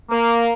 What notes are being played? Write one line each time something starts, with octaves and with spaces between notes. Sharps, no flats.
A#3